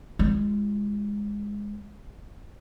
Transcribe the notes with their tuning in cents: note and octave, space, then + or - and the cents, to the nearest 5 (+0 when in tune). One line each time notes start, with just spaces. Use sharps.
G#3 -15 F4 +0